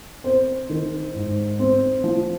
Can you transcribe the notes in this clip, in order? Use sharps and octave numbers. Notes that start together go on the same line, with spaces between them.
C4 C5
D#3
G#2
C4
F3